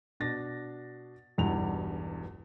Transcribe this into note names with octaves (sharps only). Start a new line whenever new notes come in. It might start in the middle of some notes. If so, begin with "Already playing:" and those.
B2 D4 A6 A#6
E1 B1 E2 G2 F7